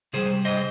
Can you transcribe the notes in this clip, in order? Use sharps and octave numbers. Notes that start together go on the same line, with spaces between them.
C3 G3 G#4 C5
C5 D#5